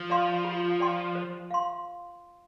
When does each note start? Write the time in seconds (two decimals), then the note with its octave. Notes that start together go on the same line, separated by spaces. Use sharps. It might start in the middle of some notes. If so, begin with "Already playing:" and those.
Already playing: F3
0.10 D5 F5 C6
0.45 F4
0.80 D5 G5 C6
1.15 C5
1.51 F5 C6